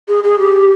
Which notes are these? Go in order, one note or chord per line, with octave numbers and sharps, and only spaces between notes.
G#4
G#4
G4